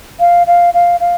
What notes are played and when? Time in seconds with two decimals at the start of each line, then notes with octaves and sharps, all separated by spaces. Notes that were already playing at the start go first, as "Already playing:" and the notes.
0.20 F5
0.47 F5
0.74 F5
1.00 F5